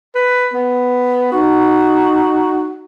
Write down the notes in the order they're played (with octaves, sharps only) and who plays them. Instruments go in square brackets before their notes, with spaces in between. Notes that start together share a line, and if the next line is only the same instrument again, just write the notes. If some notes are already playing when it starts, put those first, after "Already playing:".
[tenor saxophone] B4
B3
[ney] D#4 [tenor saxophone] F#4